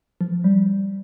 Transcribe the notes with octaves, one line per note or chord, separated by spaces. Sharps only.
F3
G3